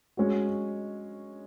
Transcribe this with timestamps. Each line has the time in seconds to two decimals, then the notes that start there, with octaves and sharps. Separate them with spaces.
0.17 G#3 C#4 F#4